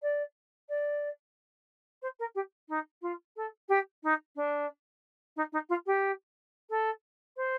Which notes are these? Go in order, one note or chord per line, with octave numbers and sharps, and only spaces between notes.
D5
D5
C5
A#4
G4
D#4
F4
A4
G4
D#4
D4
D#4
D#4
F4
G4
A4
C5